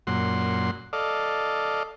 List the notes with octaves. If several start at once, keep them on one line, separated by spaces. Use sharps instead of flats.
F#2 A#2 F#5 C6
A4 D5 D#5 F5